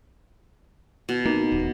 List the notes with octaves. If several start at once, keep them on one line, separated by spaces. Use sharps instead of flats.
B2
A#3 D#4
D#1